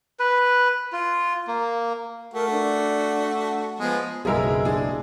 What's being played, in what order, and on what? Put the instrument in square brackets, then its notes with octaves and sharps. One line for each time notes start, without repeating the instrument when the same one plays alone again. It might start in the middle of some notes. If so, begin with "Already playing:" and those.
[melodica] B4
F4
A#3
[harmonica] A3 F#4 [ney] A#4
[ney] D4
[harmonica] F3 G#3 [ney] B3
[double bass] F#1 G#3 [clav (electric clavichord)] B1 E4 F5 [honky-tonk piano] G#4 A#4 E6
[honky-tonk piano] D4 G#4